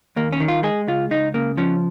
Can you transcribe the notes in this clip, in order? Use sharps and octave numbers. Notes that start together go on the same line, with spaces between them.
D#2 A#3
C#4
D#3
F4
G#3 G#4
C#2 F4
C#2 D#4
C#3 A#3
F3 C#4